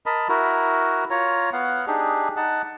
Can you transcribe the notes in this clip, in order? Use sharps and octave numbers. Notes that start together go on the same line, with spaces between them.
A#4 D#5 A5 B5
E4 F#4 A#4
F4 C#5 A#5
B3 F5 F#5
D4 D#4 G4 G#4
D#4 F#5 A5